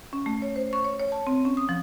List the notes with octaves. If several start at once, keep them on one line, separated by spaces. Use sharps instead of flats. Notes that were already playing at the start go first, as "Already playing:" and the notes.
C#4
A3
C#5
C5
C#6
C#5
C#5
A5
C4
C#4
D#6
F3